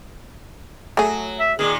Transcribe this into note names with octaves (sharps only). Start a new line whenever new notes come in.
F#3 A3 G#4
E5
A#2 D#3 G#4